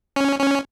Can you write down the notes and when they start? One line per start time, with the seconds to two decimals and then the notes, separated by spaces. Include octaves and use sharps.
0.16 C#4
0.39 C#4